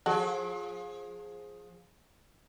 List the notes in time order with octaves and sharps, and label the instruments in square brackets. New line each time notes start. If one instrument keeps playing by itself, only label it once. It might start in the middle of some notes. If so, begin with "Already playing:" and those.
[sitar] F3 G#4 [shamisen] F#4 A4